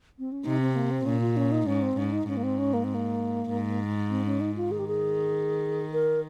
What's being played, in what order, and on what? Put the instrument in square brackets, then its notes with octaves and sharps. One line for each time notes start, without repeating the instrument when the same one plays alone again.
[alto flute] C4
C#4
[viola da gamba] C3 [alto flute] D#4
[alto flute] C4
A#3
C4
[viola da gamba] A#2 [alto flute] C#4
[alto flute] F4
C#4
D#4
[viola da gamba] G#2 [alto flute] C#4
[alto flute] C4
[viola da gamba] G#2 [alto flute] C#4
[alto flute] D#4
[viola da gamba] G#2 [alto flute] C#4
[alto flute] A#3
C4
C#4
A#3
C4
A#3
[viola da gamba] G#2
[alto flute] C4
C#4
D#4
F4
[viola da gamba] D#3 [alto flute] G#4
[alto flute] G4
G#4
A#4